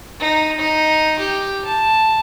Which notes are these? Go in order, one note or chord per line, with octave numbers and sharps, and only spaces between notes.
D#4
D#4
G4
A5